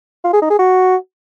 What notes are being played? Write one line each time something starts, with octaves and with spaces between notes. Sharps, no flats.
F4
G#4
D#4
G#4
F#4